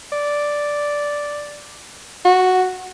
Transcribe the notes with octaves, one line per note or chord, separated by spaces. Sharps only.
D5
F#4